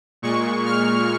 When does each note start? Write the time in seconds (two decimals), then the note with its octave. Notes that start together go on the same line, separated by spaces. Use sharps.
0.22 A#2 G#3 C#6
0.66 F6